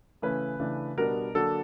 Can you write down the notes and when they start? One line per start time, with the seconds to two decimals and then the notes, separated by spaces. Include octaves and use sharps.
0.22 C#3 E3 A3 C#4 B4
0.60 C#3 E3 A3 D4
0.97 B2 G3 B3 D4 A#4
1.35 D3 F#3 A#3 D4 A4